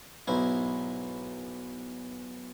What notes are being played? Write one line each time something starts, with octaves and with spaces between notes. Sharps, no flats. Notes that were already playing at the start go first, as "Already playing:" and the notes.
B1 G#2 E4